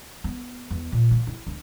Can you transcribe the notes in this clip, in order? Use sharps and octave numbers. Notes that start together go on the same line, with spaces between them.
B3
E2
A#2
A#3
E4
D2